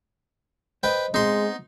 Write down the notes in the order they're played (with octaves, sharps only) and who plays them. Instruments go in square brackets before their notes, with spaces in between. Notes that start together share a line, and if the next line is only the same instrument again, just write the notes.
[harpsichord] B4 G5 [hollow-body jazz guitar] C5 D#5
[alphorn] G#3 [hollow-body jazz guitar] B3 C4 [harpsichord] D#4 C6